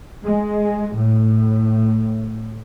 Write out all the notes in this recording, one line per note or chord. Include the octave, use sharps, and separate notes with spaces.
G#3
A2